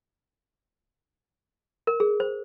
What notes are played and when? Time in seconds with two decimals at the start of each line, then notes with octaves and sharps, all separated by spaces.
1.87 A#4
2.00 G#4
2.20 C5